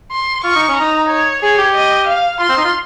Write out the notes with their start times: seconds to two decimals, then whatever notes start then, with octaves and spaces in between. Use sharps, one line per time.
0.12 C6
0.44 F4 C#6
0.55 D#4
0.68 C#4
0.76 D#4 A#5
1.09 C#5
1.42 G#4 C#5
1.58 G4
1.74 D#5
2.07 F5
2.40 F4 C6
2.49 C4
2.57 D#4
2.65 F4